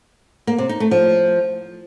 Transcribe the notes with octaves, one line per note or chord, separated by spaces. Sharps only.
A#3
C3
D#4
A3
F3